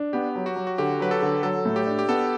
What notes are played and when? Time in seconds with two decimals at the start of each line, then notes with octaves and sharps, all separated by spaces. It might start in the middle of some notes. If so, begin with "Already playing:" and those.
Already playing: D4
0.13 B3 G4
0.35 F#3
0.46 F#4
0.56 F#3
0.67 F#4
0.78 D3 G4
1.00 F#3 B4
1.11 A4
1.22 D3
1.43 F#3 A4
1.65 A2
1.76 G4
1.87 D4
1.99 G4
2.08 B3 A4